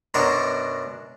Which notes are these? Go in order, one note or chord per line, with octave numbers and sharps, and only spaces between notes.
F#2 B2 D4 A#4 C5 C#6